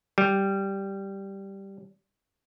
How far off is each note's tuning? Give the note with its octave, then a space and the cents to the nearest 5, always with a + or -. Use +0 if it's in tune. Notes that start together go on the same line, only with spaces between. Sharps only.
G3 -5